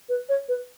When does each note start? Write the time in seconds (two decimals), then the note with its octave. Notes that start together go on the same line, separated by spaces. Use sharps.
0.09 B4
0.29 C#5
0.49 B4